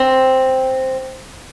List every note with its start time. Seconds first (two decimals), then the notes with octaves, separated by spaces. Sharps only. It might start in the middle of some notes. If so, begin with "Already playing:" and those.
Already playing: C4